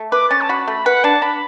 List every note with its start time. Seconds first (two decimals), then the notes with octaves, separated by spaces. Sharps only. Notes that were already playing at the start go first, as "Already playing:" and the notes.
Already playing: A3
0.12 B4 D6
0.30 C#4 A6
0.41 A5
0.49 F#4 B5
0.67 A3 B5
0.86 B4 F#5
1.04 D4 A5
1.22 D4 B5